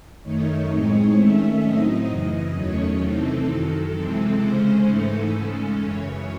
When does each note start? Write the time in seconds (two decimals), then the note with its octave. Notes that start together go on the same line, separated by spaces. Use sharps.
0.22 F#2 D#3 A3 D#4 C#5
0.69 A2 G#3 C4 D#4
1.15 D#3 A3 C#4 E5
1.62 A2 F#3 C4 D#4 D#5
2.08 F#2 C#3 E3
2.54 E2 D#3 F#3 A3 C#4 C#5
3.01 C3 E3 C4 D#4 A4
3.46 F#2 D#3 F#3 A4
3.93 C3 E3 G#3 C4 A4
4.39 C#3 G#3 C#4 C5
4.86 G#2 E3 A3 D#4 A4
5.32 C#3 G#3 C#4 A4
5.79 F#2 C#3 E3 C#5